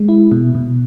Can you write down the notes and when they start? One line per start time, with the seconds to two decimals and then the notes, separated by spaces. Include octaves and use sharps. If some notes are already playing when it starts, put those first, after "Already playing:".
Already playing: G#3
0.08 E4
0.31 B2
0.55 B2